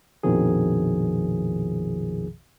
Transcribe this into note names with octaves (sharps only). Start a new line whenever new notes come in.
A#1 F2 B2 D#3 F3 G#4